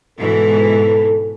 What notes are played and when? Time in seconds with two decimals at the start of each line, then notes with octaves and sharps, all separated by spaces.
0.19 G#2 B2 E3 A4